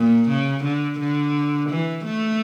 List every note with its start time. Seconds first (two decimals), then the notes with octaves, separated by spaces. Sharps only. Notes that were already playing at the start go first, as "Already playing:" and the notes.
Already playing: A#2
0.30 C#3
0.64 D3
0.99 D3
1.70 E3
2.05 A3